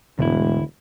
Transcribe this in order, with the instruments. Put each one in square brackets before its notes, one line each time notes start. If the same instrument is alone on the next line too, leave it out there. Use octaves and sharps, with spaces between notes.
[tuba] E1 [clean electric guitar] D2 E4 [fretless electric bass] G#2 B2